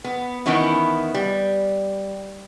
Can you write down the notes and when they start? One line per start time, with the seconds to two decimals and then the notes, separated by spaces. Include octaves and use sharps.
0.04 B3
0.46 D#3 E3 B3 C#4 E4
1.14 G3